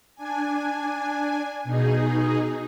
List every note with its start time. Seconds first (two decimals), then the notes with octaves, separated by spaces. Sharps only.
0.16 D4 G#5
1.64 B2 D#4 G#4